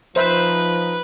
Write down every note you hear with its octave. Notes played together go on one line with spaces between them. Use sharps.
F3 D#4 B4 C5 E5